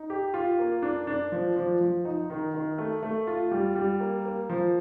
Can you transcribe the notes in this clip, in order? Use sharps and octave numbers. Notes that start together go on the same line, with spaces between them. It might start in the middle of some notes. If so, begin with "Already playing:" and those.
Already playing: D#4
G4
F4
A#3
D4
D4
F3
F3
F3
D#4
D#3
D#3
A3
A3
F4
G3
G3
A#3
A#3
F3